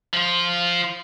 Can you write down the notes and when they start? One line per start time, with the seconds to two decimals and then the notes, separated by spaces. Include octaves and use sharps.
0.14 F3 F4